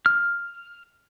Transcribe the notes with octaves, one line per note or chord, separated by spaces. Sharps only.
F6